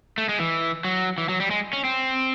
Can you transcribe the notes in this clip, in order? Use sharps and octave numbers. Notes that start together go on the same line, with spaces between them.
A3
G#3
E3
F#3
E3
F#3
G3
G#3
C#4
C4